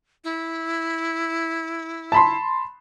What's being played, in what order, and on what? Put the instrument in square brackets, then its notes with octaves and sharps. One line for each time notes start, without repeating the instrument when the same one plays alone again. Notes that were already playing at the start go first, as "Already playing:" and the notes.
[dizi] E4
[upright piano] A5 B5 C6